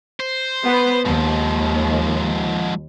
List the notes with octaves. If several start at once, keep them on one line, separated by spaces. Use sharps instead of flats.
C5
B3 B4
D#2 G#2 F3